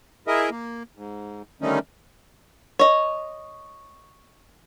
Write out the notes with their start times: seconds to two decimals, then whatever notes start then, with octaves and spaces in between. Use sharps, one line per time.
0.27 E4 G#4 A#4 D#5 E5
0.50 A#3
0.95 G#2
1.62 D3 D#3 G3 A3 C#4 D#4
2.79 C#5 D#5